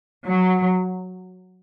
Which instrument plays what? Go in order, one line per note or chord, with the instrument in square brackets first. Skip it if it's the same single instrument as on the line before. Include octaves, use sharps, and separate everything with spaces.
[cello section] F#3